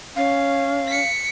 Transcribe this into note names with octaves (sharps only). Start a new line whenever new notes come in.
C#4 F5
B6 C#7